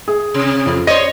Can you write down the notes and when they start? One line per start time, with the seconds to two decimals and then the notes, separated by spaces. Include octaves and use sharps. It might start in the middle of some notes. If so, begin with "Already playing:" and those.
0.08 G#4
0.34 C3
0.66 F2
0.87 C5 C#5 D#5 A#6